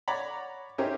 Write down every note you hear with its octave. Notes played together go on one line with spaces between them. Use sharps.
C#5 D5 F#5 A#5 B5
C4 C#4 D#4 E4 G4 A#4